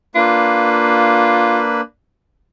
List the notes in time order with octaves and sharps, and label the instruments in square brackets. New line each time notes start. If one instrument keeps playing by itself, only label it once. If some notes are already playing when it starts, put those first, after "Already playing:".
[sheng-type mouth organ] A#3 D4 B4 [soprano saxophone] F4